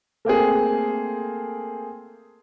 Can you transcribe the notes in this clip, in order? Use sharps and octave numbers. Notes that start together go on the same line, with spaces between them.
A3 A#3 C4 G#4